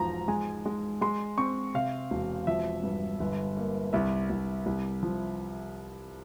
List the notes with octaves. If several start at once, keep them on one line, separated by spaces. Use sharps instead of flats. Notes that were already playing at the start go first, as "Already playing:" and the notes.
Already playing: E1 G#2 F3 A#5
G#3 G#5
G#3
G#3 C6
C4 C#6
C3 F5
E1
F3 E5
G2
G1
A#3
C2 E5
C2
C2
F3